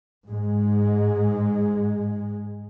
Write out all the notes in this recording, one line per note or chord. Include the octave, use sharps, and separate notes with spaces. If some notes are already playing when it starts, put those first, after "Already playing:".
G#2 G#3